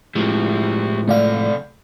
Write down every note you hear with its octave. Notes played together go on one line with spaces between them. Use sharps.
A2 F3 G#3 E4 G4
C3 A3 A4 D5 F5